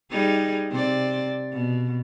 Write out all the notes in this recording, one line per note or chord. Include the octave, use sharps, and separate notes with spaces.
G3 D#4 G#4
C3 C5 D5
B2